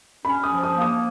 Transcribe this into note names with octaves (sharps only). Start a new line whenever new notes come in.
C#4 B5
D#6
F3
D#6
A#3
D#6